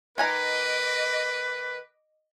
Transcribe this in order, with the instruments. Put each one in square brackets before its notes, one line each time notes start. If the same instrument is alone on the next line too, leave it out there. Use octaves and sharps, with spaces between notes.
[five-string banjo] D#3 G#5 A#5 [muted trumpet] B4 [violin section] D#5 D6